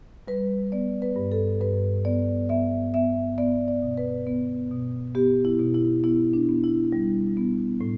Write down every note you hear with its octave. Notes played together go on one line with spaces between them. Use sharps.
G3 B4
B3 D5
B4
G2
A4
G2 B4
B3 D5
B3 E5
B3 E5
B3 D5
D5
B2
B4
B3
B2
B3 G4
E4
B2
E4
B3 E4
D4
B3
E4
G3
B3
A2